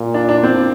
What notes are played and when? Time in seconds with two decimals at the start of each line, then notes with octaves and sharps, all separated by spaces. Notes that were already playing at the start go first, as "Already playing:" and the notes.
Already playing: A#2
0.14 D4
0.29 D4
0.43 C4